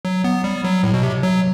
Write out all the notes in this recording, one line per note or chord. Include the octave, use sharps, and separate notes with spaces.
F#3
B3
G3
F#3
A2
B2
C3
F#3